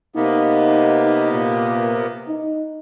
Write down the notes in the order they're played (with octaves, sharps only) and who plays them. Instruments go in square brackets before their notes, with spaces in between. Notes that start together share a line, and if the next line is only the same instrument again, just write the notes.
[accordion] C3 A#3 B3 [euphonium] D#4
[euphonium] A#2
D#4